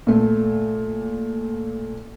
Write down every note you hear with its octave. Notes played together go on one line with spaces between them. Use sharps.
A#2 A3